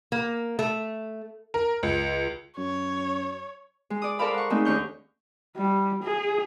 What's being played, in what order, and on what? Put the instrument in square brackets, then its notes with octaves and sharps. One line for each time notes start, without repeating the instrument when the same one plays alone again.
[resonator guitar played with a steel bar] A#3
A3
[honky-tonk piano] A#4
C#2
[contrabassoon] F#2 [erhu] C#5
[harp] G#3
D5 D#6
A4 A#4 C5 D5 F5 B5
F#5 C#6
G#3 A3 C4 D#4
D#2 C#4 D4 C#6 F6 G6
[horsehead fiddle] G3
G#4